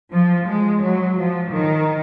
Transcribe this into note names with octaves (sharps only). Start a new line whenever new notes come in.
F3
G#3
F#3
F3
D#3